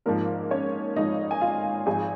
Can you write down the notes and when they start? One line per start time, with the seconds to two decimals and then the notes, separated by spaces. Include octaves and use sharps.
0.06 G#1 G#2 F3 A#3 A#4
0.51 C#4 C#5
0.96 G#1 G#2 F3 D#4 D#5
1.31 G#5
1.41 F4 F5
1.86 G#1 G#2 F3 G#4 G#5